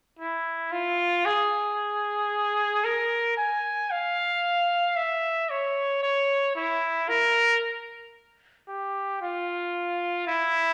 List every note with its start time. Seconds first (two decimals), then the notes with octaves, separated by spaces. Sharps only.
0.19 E4
0.72 F4
1.25 G#4
2.84 A#4
3.37 G#5
3.91 F5
4.96 E5
5.50 C#5
6.03 C#5
6.56 E4
7.09 A#4
8.68 G4
9.21 F4
10.27 E4